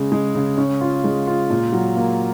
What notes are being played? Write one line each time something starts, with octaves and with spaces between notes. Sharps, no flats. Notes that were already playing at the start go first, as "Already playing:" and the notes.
Already playing: C#3 G#3
G#3
C#3
C#4
F4
G#3
F4
A#2
F#3
A#3